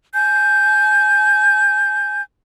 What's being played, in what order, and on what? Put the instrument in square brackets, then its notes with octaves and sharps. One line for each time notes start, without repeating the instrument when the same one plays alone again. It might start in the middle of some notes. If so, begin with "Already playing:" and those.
[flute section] G#5 G6